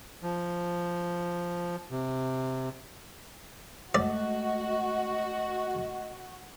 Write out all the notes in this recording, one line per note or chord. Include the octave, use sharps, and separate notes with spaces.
F3
C3
G#3 A3 F#4 D5 D#5